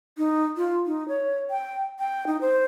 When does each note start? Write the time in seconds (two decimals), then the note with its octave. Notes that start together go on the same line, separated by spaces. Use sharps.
0.18 D#4
0.57 F4
0.87 D#4
1.08 C#5
1.50 G5
1.99 G5
2.27 D#4
2.41 C5